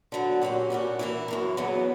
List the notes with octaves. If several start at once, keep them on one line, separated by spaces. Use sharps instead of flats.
D3 F#3 B3
A#2 F#3 C#4 G4
A#2 G3 C#4 F#4
E3 A#3 E4
F#2 E3 A#3
E2 C#3 F#3 B3